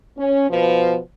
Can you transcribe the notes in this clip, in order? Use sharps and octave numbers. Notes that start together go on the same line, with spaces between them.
C#4
B2 F3 B3